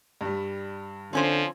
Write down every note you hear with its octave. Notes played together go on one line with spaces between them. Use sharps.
G2 G3
D3 F3 C4 C#4 C5